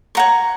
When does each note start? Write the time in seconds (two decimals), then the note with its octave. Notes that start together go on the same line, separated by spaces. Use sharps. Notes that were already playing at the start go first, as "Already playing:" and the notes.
0.15 C#5 F#5 A#5 C#6